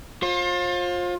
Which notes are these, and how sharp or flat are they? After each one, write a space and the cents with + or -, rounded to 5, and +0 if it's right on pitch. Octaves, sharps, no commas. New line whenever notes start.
F4 +25 C5 +40